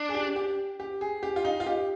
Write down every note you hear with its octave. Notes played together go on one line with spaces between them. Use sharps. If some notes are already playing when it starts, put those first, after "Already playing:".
Already playing: D4
G#4
G4
G4
G4
G#4
G4
F4
D#4
F4
G4